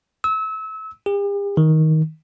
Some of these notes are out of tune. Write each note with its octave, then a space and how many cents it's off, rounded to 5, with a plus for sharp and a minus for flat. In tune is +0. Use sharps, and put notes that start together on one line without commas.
E6 -30
G4 +45
D#3 +15